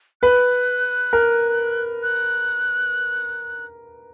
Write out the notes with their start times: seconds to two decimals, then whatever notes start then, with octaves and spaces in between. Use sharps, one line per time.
0.22 B4 F#6
1.13 A#4
2.03 F#6